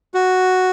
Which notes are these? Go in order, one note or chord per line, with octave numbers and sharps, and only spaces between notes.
F#4